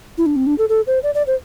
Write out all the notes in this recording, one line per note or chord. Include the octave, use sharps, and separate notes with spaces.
E4
D4
C4
D4
A4
A4
C5
D5
D5
C5